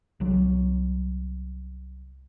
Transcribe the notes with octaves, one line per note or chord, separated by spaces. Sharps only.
C2 F#3